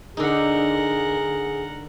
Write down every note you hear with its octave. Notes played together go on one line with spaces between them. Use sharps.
D3 D#4 G#4 A#4 F#5